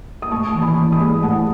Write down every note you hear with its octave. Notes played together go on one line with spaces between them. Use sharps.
D#6
A2 A5 C#6
E3 A5
G#5 B5
E3
B5 D#6
G#3
A2 F#5 A5